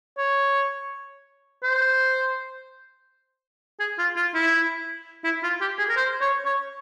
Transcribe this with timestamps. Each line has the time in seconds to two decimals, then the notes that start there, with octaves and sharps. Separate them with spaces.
0.18 C#5
1.64 C5
3.80 G#4
3.99 F4
4.17 F4
4.34 E4
5.24 E4
5.43 F4
5.61 G4
5.79 G#4
5.90 A#4
5.97 C5
6.21 C#5
6.45 C#5